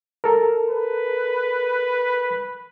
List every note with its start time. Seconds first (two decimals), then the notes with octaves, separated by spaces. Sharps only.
0.24 A4 A#4
0.69 B4